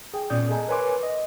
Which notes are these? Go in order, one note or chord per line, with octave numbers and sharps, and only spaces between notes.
G#4 G5
A#2 B3 C#4 D5 D#6 G6
G#4 A4 D#5 G#5 A#5
A#4 B4 C#5 G#5 C6 D6
D#5